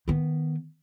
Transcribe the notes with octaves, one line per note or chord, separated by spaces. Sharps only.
D#3 B3